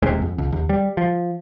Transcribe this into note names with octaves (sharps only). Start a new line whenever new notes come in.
D#1 D#2 C3 G#3
F2
C#2
D#2
G3
F3